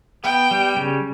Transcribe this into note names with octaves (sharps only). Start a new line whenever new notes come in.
B3 G5
G3
C#3